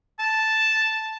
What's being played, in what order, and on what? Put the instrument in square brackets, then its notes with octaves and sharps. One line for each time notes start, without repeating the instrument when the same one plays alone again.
[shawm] A5